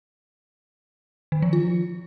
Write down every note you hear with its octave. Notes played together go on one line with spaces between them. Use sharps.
D#3
F3
F4